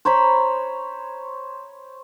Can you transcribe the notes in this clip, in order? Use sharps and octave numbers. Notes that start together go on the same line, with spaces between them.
C5 C#5 A#5 B5